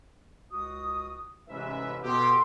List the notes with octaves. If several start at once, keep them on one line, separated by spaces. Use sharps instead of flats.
C#2 F#4 D#6
A1 G#2 C3 C#4 B4 E5
B2 G4 A4 B4 C6